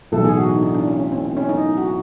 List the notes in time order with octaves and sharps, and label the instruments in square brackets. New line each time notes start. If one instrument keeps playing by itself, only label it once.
[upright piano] B1 A2 E3 [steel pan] A4
[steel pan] G#4
F#4
D#4
D4
D4
C#4
C#4
C4
C4
C#4
D#4
F#4